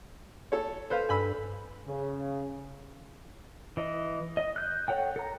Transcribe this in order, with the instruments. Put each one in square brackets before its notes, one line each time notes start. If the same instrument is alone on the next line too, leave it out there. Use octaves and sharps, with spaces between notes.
[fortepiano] A4 C#5
[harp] A4 B4 [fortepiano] C5 F5
[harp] G2 [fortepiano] G#5 B5 E6
[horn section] C#3
[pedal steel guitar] E3 D#5
D#5
F#6 G6
A4 C#5 F#5 G5
A4 A#5